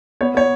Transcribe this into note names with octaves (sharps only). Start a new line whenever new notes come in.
B3 C#5
B3 C#5